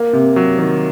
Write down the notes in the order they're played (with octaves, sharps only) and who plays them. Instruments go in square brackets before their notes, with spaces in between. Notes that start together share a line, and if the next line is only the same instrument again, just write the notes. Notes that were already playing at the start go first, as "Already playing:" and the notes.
Already playing: [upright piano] A#3
C3
F#3
D#3